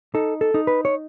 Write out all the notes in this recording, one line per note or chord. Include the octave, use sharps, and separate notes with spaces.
D#4 A4
A4
D#4
B4
C#5